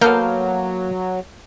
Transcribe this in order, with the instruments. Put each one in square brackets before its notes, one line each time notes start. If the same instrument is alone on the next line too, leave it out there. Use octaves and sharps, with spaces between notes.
[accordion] F#3 [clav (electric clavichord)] A#3 [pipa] B3 A4 F5 [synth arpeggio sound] A#4 F6 G6